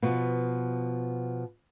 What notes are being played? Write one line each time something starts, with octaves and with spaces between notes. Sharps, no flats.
B2 F3 B3